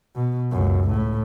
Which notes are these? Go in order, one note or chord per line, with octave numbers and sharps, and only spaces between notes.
B2
C#2 F#2
A2